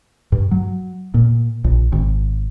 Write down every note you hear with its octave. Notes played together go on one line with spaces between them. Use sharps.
G2
F#3
A#2
A#1
G#1